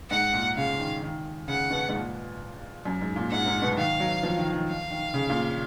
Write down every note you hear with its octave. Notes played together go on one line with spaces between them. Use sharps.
G#2 F#5
A#2
C#3 F5
D#3
D#3
C#3 F#5
B2
G#2
A#2
F#2
G#2
A#2
G#2 F#5
G#2
B2
D#3 F5
F#3
F3
D#3
D#3
F5
D#3
C#3
A#2